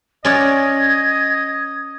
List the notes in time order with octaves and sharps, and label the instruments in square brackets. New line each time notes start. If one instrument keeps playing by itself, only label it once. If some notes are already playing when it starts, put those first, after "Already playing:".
[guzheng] C#4 D5 F#5 [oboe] D#5 [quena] G#6